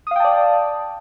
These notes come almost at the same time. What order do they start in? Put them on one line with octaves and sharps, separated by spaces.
D#6 F5 G5 A5 D5